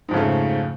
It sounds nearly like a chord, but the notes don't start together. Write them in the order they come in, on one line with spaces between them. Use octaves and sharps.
G#2 F2 C#3 A3